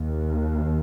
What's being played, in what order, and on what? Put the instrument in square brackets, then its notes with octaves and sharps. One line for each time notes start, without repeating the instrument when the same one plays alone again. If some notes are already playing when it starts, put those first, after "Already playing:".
Already playing: [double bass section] D#2